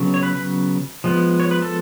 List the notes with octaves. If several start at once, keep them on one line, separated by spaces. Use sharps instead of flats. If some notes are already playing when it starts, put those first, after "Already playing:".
Already playing: C#3 F#3 B3
C#5
B4
B4
F3 G#3 B3
C#5
B4
A4